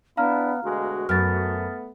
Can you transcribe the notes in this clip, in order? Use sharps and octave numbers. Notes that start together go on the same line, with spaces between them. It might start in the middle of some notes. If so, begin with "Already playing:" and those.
B3 D4 E4 F5 A#5 F6
D2 B2 G#3 F#4
F#2 A3 B3 F6 A6